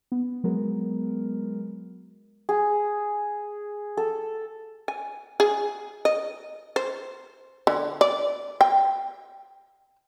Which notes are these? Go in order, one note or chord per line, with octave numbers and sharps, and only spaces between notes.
B3
F#3 G#3 B3 A#4
G#4
A4
G#5
G#4
D#5
C5
D3
D5
G5